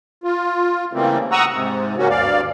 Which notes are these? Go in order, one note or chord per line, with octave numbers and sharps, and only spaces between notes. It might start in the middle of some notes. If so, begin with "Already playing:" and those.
F4
C#3 E3 G3 A3 A#3 C4
F#5 A#5 C#6 D#6 E6
G#2 C3
C#3 A#3 C#4 F#4
D2 G2 D5 F5